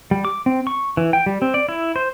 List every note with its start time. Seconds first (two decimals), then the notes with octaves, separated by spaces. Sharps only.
0.11 G3
0.25 D6
0.46 C4
0.67 C#6
0.97 E3
1.13 G5
1.26 G3
1.42 C4
1.54 D5
1.69 E4
1.96 C5